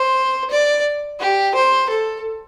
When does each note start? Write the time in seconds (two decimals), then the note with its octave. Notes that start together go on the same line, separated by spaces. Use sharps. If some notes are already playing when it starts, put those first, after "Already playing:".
Already playing: C5
0.50 D5
1.19 G4
1.55 C5
1.90 A4